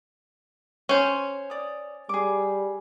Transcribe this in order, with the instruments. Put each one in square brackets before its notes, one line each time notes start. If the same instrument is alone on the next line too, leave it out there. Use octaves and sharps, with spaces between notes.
[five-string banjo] C#4 C5
[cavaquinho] D5 D#6
[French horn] G3 [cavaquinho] G#4 D6